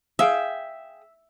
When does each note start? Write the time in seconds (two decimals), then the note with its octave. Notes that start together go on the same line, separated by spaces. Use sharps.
0.19 G#4 E5 F5 G5